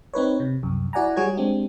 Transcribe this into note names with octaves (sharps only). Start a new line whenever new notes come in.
C4 D#4 B4 C#5
C3
C2 F#2
E4 F#4 D5 F#5 G#5 A#5
G3 F#4 G#4 C#5 G#6
G#3 C4 D4 G4